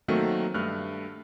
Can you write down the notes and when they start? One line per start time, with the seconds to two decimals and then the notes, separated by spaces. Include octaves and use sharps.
0.08 D#3 F#3 A3 A#3 C4 F#4
0.54 G2 A3 F6 F#6